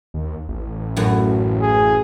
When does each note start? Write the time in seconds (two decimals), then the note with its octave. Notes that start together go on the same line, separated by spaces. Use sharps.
0.14 D#2
0.48 A1
0.97 F#2 A2 F#3
1.61 G#4